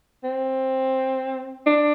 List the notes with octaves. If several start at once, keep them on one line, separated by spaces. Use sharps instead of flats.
C4
D4